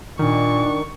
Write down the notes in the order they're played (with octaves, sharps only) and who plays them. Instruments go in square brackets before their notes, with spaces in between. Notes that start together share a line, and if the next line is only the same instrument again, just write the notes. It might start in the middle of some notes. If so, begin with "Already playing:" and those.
[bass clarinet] A#2 [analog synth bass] D#3 [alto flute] D4 [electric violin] C#6